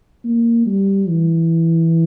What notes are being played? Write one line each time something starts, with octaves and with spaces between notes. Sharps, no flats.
A#3
G3
E3